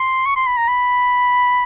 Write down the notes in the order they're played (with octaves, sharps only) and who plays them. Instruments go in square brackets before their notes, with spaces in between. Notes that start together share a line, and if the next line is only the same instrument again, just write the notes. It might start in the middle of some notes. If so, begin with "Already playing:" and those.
Already playing: [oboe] C6
C#6
C6
B5
A#5
B5